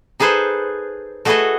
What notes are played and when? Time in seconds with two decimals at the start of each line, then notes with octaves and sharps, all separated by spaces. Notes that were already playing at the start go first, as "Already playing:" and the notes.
0.20 D#4 G#4 A4 B4 C5
1.25 A3 F#4 G#4 A4 B4 D#5